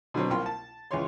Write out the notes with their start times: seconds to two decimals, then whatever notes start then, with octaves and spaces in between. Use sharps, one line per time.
0.14 B2 D3 F#3 C4
0.30 C2 A#3 F4 G5 C6
0.46 A5
0.91 C#2 E3 G#3 C#5 C6